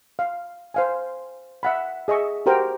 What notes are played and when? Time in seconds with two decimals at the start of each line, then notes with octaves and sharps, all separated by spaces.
0.19 F5
0.74 C5 F5 G#5
1.63 E5 F#5 B5
2.08 G#4 D#5 E5 C#6
2.46 F#4 G4 A#4 C5 G5